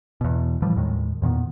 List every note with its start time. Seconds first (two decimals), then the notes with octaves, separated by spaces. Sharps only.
0.21 E2 B2
0.62 A2 E3 F3 G3
0.76 D#2 A2 D#3 G#3
1.22 E2 A#2 D#3 B3